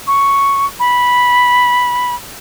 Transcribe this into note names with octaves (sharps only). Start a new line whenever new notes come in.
C#6
B5